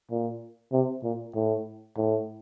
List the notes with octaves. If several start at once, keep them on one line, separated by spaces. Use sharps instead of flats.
A#2
C3
A#2
A2
A2